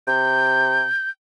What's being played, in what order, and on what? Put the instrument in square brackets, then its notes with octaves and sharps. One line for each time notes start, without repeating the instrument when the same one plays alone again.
[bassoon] C3 [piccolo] G6